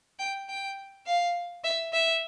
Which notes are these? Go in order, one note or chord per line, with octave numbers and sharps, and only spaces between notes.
G5
G5
F5
E5
E5